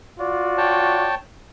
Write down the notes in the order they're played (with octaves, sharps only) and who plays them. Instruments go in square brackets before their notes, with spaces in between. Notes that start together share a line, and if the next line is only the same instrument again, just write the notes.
[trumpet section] F4 F#4 D5
[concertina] C#5 G5 A5